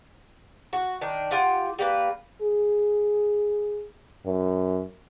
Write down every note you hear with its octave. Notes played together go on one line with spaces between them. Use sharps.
F#4
D#3 D4
F4 G4 F#5
G3 A#3 B4
G#4
F#2